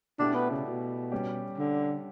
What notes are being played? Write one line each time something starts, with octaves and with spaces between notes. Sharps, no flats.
B2 A3 D4 E4 G4 D5
B3
C#3
B2
G3 C#4 G4
D3